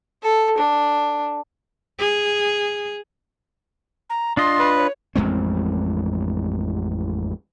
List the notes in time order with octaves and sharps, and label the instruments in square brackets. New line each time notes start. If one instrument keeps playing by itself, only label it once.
[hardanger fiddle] A4
D4
[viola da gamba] G#4
[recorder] A#5
[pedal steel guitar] D4 F4 D#5 [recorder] C6
[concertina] B4
[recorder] C#5
[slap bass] A1 F2 G#3 C4